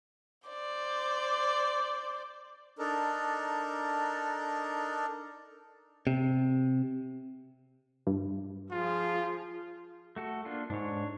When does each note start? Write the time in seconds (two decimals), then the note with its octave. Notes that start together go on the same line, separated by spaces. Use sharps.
0.48 C5 D5
2.79 D4 D#4 A4 A#4
6.07 C3
8.07 G2
8.71 F3 F4 G#4
10.16 A3 F#4 A4
10.45 A#3 D4 F4
10.70 G#2 D4 C#5